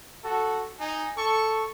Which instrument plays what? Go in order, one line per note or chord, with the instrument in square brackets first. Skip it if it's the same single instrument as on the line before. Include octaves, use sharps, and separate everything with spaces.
[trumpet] F#4 [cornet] A4
[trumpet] D#4 [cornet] G#5
[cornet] A4 [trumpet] C#6